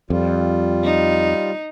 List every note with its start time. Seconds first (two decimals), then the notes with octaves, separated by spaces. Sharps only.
0.10 F2 G3 F4
0.84 D#4